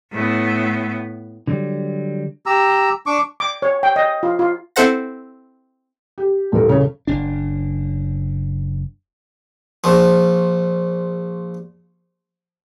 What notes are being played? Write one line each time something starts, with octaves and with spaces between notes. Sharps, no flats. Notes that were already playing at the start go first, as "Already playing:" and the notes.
A2 B3
D3 F#3 G3
G4 A#5 E6
D4 C#6 D6
D6
C#5
G5
D#5
F4
F4
C4 E4 A4 C5 F#5 A#6
G4
D#1 G2 E3 E4 A4 A#4
D#1 C#3 C#4 C#5
F#1 D4
A#1 F3